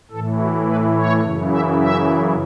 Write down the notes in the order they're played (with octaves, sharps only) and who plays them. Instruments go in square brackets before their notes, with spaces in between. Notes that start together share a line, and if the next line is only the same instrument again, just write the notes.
[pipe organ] A2 E3 A4
F#4
B4
C#5
F#2 C#3 E3
E5
E5